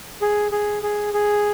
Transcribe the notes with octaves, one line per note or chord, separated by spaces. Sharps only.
G#4
G#4
G#4
G#4